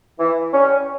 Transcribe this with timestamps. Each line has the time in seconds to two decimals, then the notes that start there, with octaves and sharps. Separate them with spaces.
0.19 E3
0.53 G3 C#4